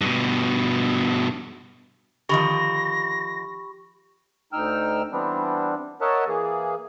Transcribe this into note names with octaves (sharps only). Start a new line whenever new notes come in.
G2 B2
D3 D#3 F3 G4 B5 C#6 A#6
D2 D#4 G5 E6 F6
E3 G3 B3 C4 D4
A#4 C#5 D#5 E5 F#5 A5
E3 A#3 G#4